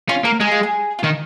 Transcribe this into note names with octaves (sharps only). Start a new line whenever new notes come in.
C#4 F4
A#3 A#4
G#3 G#4
F4
G#4
F4
D#3 D#4